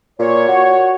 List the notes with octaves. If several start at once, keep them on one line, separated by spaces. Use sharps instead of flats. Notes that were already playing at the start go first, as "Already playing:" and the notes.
A#2 C#5
F#4